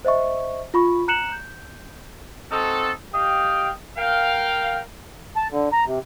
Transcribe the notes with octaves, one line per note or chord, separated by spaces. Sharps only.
C5 D#5 E5 C#6
F4 B5 C#6
A#5 F#6 C#7 E7 F#7
G6
C4 D#4 F#4 A4
G4 D#5 F5 G5
A#4 F5 G5
A5
D3
A#5
C3